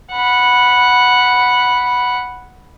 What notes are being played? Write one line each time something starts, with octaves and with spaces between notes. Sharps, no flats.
F#5 B5